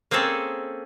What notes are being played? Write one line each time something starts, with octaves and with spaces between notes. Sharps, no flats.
A#3 C4 C#4 G#4 A4